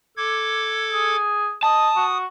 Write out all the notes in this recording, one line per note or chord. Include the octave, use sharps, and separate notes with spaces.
A4 D6 G#6
G#4
D#5 A5 D#6
F#4